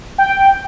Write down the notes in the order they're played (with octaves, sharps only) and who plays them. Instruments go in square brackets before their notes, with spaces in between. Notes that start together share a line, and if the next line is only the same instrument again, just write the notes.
[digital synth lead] G5